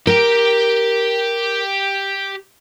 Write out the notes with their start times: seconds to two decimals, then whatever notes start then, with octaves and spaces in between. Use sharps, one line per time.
0.07 G4 A#4 G5